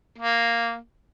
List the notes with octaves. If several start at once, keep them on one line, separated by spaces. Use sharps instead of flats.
A#3